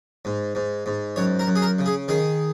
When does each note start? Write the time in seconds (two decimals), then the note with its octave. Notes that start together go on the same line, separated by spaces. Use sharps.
0.25 G#2
0.55 G#2
0.86 G#2
1.16 F#2 C#5
1.39 A#4
1.47 F#2
1.56 G#4
1.62 A#4
1.79 C#3
1.86 G#4
2.08 D#3 G#4